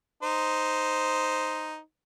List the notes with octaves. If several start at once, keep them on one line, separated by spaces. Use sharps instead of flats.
D#4 C5